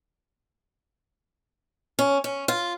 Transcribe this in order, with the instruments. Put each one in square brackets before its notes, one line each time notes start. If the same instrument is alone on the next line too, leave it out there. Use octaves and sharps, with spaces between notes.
[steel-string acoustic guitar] C#4
C#4
F4